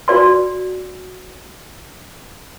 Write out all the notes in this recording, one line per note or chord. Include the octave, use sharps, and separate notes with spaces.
F#4 D5 C6